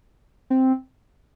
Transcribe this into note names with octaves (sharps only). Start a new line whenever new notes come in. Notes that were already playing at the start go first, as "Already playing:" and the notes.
C4